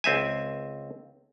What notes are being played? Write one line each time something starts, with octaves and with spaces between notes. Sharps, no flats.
C#2 C4 E5 G#5